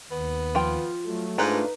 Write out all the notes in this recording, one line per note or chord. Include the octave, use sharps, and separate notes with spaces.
D#2 B3
F3 F4 G5
F#3 A3
G#2 A3 D4 D#4 F4 B4 A#5